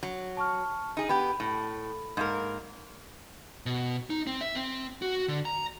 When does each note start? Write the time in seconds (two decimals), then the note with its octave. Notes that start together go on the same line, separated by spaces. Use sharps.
0.03 F#3
0.37 A5 C#6 F6
0.97 D#4 G#4
1.09 B3 G4 B5
1.40 A2
2.17 G#2 A#3 A#4
3.66 B2
4.10 D#4
4.27 C4
4.41 E5
4.55 C4
5.02 F#4
5.28 D3
5.45 A#5